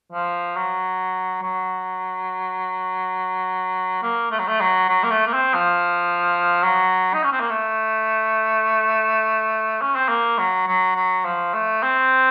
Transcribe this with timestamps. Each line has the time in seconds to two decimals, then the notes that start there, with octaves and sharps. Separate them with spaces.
0.12 F3
0.56 F#3
1.43 F#3
4.02 A#3
4.32 A3
4.39 F#3
4.48 A3
4.60 F#3
4.89 F#3
5.03 A#3
5.11 A3
5.27 A#3
5.33 C4
5.54 F3
6.63 F#3
7.14 D#4
7.24 C#4
7.32 C4
7.40 A#3
7.50 A3
9.82 C#4
9.95 C4
10.09 A#3
10.38 F#3
10.68 F#3
10.96 F#3
11.25 F3
11.54 A3
11.83 C4